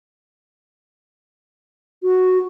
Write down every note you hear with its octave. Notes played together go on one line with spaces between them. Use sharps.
F#4